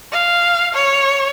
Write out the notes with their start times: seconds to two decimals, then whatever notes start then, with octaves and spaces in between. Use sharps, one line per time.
0.13 F5
0.74 C#5